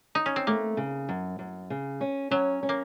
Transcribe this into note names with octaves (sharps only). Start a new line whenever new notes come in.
D#4
C#4
C4
A3 A#3
C#3
F#2
F#2
C#3
C#4
F#3 C#4
C#4
A#3